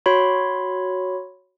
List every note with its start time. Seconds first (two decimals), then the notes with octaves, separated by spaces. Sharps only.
0.06 F#4 C#5 B5 C6